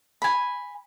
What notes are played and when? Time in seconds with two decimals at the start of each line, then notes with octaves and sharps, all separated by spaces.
0.22 G#5 B5